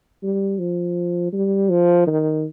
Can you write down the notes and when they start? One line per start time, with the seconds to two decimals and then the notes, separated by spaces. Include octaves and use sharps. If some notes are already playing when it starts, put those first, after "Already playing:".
0.23 G3
0.59 F3
1.33 G3
1.70 F3
2.07 D#3